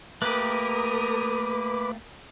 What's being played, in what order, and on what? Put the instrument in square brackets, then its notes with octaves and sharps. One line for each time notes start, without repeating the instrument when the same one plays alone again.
[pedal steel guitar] A3 A#3 G4 [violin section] A#4 D#6 [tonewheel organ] B4 B5 D6